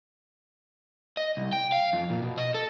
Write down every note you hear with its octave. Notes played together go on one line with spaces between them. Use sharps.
D#5
C2
G5
F5
F2
A#2
B2
D#5
A4